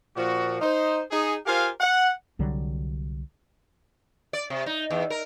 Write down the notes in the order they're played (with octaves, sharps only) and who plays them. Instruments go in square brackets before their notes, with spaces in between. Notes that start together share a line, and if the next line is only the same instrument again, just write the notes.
[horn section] A#2 F3 F#4
D#4 C5
D#4 G#4
F4 G4 A#4 C5 F5 G#5
F#5
[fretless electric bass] C2 D3 F#3 G3
[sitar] D5
C3
D#4
E2
A#4